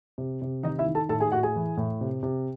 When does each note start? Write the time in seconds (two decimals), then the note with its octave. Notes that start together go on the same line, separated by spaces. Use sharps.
0.18 C3
0.42 C3
0.63 D#3 D#4 D#5
0.79 E4 E5
0.86 D#3
0.95 A4 A5
1.09 A2 A4 A5
1.20 G#4 G#5
1.32 A2 F#4 F#5
1.43 G#4 G#5
1.56 E3
1.77 A2
2.01 C3
2.23 C3